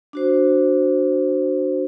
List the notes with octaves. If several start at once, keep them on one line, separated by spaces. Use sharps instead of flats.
D4 F#4 C5